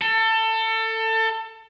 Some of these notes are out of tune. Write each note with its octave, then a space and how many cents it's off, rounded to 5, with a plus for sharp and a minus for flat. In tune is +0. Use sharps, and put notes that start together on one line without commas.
A4 +25